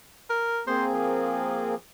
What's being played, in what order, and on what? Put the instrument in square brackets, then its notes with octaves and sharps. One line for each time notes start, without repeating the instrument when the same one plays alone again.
[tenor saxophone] A#4
[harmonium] A#3 C4 G#4 [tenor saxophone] C5
[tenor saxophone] F3